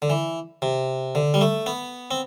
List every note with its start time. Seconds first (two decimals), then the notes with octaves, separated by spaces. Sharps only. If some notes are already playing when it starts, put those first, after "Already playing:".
0.02 D3
0.10 E3
0.62 C3
1.15 D3
1.34 G3
1.41 A3
1.66 B3
2.11 C4